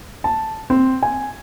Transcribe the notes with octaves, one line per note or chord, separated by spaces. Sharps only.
A5
C4
G#5